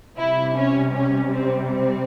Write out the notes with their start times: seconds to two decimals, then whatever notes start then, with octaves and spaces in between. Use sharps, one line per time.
0.17 C3 G3 E4
0.56 C#4
0.94 C#4
1.32 C4
1.70 C4